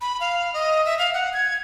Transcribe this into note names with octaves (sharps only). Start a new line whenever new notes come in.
B5
F5
D#5
E5
F5
F#5
G#6